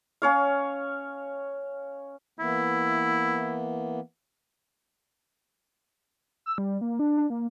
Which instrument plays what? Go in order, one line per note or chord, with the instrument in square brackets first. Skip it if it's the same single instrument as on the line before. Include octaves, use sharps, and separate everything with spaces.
[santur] C#4 C#5 F5
[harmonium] E3 A#3 B3 [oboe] E4
[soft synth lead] E6
G3
A#3
D4
D4
A#3